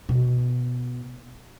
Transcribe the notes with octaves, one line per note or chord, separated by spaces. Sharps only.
B2